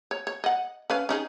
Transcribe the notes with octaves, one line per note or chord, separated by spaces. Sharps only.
C#5
C#5
D#5 F#5
C#4 B4 F5
C#4 D#4 G#4